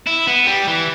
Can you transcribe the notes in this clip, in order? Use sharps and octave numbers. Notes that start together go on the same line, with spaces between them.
E4
B3
G3
E3